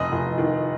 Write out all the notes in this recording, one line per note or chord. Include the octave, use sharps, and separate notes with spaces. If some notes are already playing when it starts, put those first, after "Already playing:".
Already playing: F1 D#5
F1
D#3